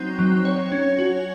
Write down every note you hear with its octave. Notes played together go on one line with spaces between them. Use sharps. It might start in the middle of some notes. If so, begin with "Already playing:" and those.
Already playing: F#3 C4 D#4
F#3
C#5
C#4
F#4